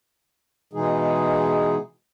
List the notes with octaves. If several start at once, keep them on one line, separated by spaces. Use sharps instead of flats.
B2 E3 G#3 D#4 G#4